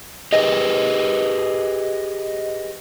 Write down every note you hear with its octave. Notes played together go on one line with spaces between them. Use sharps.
G4 G#4 B4 D#5